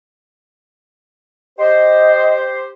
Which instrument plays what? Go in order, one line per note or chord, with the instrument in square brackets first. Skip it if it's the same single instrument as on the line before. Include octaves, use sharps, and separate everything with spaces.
[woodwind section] G4 C5 [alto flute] D#5